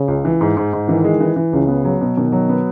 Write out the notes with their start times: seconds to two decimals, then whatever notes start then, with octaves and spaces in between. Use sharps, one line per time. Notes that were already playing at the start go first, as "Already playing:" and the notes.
Already playing: C#3
0.08 C#2
0.25 E3
0.41 G#2
0.57 G#2
0.73 G#2
0.88 D#3 E3
1.04 G#3
1.21 E3
1.36 E3
1.53 C#2 C#3
1.68 B3
1.85 F#3
2.01 B2
2.17 B2 D#3
2.32 F#3
2.49 B3